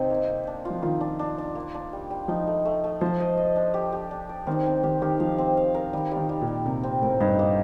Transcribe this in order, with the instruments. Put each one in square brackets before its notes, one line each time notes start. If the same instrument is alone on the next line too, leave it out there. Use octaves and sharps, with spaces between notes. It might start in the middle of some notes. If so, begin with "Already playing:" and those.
Already playing: [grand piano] C3 [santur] C4 D#4
[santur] A#3
A#3
D4
F4
[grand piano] F3
[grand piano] D#3 [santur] F4
[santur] D4
D4
D4
A#3
D4
G3
G3
[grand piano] F3 [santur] D#4
[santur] A3
A3
A3
[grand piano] F3 [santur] C5
[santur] D#5
D#5
D4
G4
G4
D4
D5
[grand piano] D#3 [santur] C4
[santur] C4
[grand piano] D#3 [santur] G4
[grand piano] D#3 [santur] G4
[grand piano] F3 [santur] F5
[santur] C4
F5
A#4
[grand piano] D#3 [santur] G3
[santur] G3
[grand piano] D#3
[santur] G3
[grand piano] A#2
[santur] G3
[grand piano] C3 [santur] A#4
[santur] C4
[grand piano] A2 [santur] A#4
[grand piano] G2 [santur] D#4
[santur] A#3